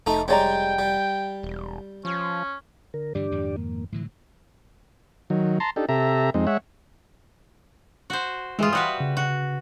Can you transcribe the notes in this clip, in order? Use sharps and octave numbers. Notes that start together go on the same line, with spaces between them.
F1 A3 D#4
G3 G#3 C#5 D5 G5 A#5
G3
E1
F3 C#4
D3 A#4
G2 D3 E3 D4 G4 D5
F2 G#2 D#3
A#3
A2 D3 E3 F#3
D#3 F#3
A5 A#5 C6
D4 D#4 G4 A4
C3 G4 A4 E5 A#5
F2 G#3 C4 D#4
G#3 C#5 E5 F#5
F#4 C5
E3 G#3 F4 G#4 D#6
G3 F#4 B4 D#6
C#3
F#4